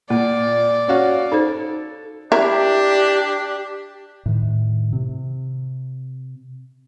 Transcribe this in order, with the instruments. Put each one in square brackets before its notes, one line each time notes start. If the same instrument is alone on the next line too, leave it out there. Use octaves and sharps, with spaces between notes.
[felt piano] A#2 [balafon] A#3 [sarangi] D5
[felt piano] C#4 F#4 F5
[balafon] D#4 C5 [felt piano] A4
[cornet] D4 [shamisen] E4 A#4 [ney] G4
[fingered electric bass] A2 D#3
C3